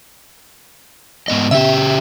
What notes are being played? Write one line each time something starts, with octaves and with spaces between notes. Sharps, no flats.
G#2 B3 D#5
C#3 G4 E5